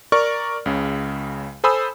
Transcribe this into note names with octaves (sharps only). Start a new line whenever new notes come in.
A#4 D5 C#6 F6
C#2 C#3
A4 C5 G#5 B5 D#6 E6